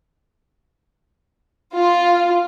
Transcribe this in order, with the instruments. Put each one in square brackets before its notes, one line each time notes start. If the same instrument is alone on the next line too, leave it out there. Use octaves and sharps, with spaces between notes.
[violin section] F4